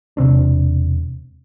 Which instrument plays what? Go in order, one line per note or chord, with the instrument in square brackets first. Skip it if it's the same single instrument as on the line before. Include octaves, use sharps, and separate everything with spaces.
[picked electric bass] E1 C3 C4 D4